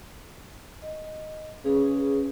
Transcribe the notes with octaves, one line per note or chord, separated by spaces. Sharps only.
D#5
C#3 C#4 G#4 B4